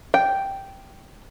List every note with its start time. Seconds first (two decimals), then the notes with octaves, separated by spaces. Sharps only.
0.14 G5